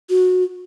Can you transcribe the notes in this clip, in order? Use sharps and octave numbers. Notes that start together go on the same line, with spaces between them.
F#4